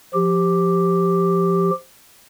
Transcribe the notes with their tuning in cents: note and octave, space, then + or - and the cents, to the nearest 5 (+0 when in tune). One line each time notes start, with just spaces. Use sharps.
F3 +0 G4 +0